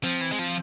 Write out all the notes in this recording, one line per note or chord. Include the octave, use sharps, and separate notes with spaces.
F3 C4
E3
G#3
F3